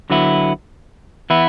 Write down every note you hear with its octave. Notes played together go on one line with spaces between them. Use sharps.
D3 F#3 B3 E4
E3 B3 E4